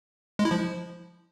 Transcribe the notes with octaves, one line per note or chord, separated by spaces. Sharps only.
G#3
E4
F3